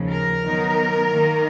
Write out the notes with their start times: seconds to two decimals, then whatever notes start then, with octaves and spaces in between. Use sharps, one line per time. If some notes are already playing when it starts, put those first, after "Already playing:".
Already playing: D#2 C#3 F3
0.10 A#4
0.43 D#3 F#3 B3 D#4
1.10 D#3 A#3 D#4